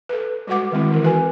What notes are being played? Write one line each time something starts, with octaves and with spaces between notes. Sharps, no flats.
A4 B4
G3 G#3 F#4 B4 F#5 D6
D#3 G#3 C4 E4
D#3 E3 A#4
F#4 B4 G#5